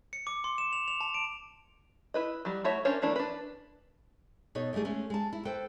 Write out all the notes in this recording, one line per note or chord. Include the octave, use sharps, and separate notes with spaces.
C#7
D6
C6
E7
F7
F7
A5
D7
E4 B4 D#5
F#3 G3
A3 E4 F#4 C#5 E5
C#4 D4 A#4 C5 C#5
E3 A3 A#3 D4 E4
D4 B4
B2 D#4 A4 C#5
E3 F#3 G3 A3 G#4
G#3 A3 C#4
G#3 A5
E4
A4 B4 C5 G5